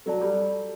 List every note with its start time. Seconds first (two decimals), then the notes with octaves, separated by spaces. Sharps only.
0.06 F#3 A4 D5 A5
0.21 G3